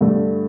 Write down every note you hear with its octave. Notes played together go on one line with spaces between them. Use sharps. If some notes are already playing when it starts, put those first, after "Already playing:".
G2 D3 A3